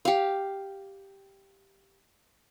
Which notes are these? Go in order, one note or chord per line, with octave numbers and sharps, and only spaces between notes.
G4 F5